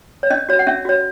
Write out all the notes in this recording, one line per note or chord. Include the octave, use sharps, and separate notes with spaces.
C#5
C#4 D#5
F#4 C#5
F#5
C#4 E5
F#4 C#5